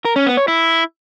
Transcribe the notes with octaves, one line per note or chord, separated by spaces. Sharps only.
A#4
C#4
B3
C#5
E4